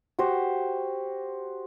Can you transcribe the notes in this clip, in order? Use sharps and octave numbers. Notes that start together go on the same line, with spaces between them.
F#4 G4 C5